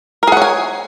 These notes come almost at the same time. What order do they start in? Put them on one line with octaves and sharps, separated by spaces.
A#4 G#4 F#5 C#5 G#5